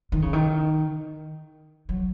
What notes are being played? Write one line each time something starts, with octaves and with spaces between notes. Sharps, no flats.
D#3
C#3
D#3
F#3